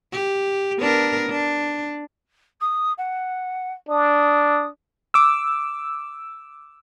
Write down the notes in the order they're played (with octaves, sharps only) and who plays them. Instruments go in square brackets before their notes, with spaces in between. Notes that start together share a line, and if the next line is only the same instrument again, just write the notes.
[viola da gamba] G4
B3 D4 A#4
D4
[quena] D#6
F#5
[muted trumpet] D4 [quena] D#6
[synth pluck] D6 E6